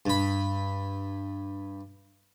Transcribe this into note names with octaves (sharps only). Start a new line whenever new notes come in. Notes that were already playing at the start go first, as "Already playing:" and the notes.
G2 B5